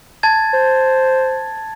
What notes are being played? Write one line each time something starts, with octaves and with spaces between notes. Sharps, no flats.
A5 G#6 A6
C5